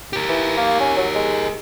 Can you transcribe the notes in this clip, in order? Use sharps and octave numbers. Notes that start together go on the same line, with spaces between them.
G4 A#4
E3
A#3
C#4
F#3
G#3